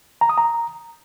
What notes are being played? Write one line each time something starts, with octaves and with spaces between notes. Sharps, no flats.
A#5
D#6
A#5